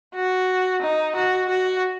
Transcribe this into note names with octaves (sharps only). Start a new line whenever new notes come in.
F#4
D#4
F#4
F#4